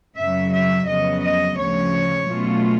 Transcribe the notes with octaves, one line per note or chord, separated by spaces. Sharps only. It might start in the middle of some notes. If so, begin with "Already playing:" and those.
F#2 C#3 F#3 E5
E5
F2 C#3 F#3 B3 D#5
D#5
D2 C#3 F3 C#5
B2 F#3 A3 C#4 F4